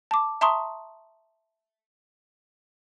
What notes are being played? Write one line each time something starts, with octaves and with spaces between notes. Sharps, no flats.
A5 D6
E5 A5 A#5 C6 C#6 D#6